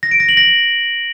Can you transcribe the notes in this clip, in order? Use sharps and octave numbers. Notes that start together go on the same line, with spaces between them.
A#6
D7
A#6
F#7
A#6